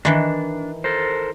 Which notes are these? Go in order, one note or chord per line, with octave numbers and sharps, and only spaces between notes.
D#3 E3 D4
A4 A#4 C5